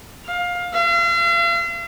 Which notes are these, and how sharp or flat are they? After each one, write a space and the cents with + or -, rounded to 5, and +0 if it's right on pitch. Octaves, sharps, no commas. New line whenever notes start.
F5 +20
F5 -40